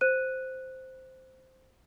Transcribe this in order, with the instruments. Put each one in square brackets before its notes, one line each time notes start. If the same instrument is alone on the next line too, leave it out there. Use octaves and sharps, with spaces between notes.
[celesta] C5 F#6 D#7